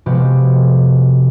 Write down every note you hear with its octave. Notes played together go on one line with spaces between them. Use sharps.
C3 F3 G#3 B3 F#4 G4